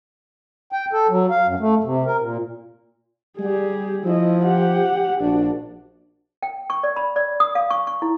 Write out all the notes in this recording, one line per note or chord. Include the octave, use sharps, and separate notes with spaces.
G5
A4
F#3
F5
F#2
A3
C3
A#4
A#2
G3 G4 G#4
F3 E4 D#5
G4 F#5
A#1 D4 F#4
G5
C#6
D5
B5
D5
D#6
F5
C#6
C#6
E4